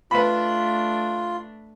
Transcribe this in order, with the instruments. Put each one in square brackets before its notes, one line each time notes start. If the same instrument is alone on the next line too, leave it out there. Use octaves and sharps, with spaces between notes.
[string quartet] A3 D4 [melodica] F4 [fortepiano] B4 B5